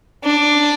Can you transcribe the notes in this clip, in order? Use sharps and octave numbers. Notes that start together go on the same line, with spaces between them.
D4